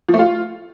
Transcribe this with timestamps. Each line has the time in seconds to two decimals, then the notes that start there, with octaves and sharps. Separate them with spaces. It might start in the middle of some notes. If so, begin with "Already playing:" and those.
0.09 F3
0.14 A3
0.19 F4